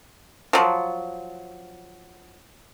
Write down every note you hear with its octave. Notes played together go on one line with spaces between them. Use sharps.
F3 F#3